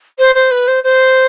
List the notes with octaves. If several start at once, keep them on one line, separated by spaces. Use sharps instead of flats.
C5
C5
B4
C5
C5